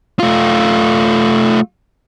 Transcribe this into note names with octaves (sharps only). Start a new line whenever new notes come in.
A3 F4